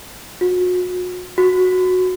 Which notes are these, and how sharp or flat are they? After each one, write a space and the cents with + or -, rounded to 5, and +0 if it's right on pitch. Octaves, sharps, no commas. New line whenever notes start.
F#4 -40
F#4 -10